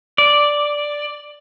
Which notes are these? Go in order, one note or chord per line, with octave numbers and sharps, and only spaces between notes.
D5